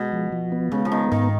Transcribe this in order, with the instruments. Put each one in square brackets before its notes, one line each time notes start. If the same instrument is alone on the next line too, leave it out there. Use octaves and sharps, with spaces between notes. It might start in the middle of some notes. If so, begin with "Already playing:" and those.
Already playing: [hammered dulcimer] B2 [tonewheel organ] G#3
[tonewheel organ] F3
F3
B3
[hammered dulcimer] C#3 [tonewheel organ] G#3
[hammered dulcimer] F3
[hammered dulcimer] D#3 [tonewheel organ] B3
[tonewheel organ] G#2 [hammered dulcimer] D#3